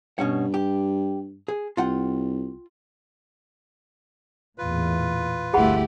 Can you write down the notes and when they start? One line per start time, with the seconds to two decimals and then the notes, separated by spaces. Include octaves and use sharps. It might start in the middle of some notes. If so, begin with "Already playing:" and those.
0.19 G2 B2 C#4 F#5
0.54 G4
1.48 G#4
1.77 C2 F4 F#5 G5
4.58 A1 E2 A#2 F4 B4
5.53 G1 D2 A3 E4 G4 G#4 F#5 B5